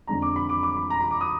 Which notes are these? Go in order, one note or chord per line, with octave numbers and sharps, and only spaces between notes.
F2 D3 G#3 D4 A#5
D6
B5
D6
D6
B5
A#5
B5
D6
D#6